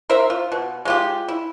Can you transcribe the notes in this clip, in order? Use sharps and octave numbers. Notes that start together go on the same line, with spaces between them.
A#4 C5 E5
F4
B2
G#3 F4 G4
E4